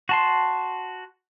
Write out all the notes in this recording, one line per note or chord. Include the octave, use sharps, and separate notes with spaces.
F#4 A5 C6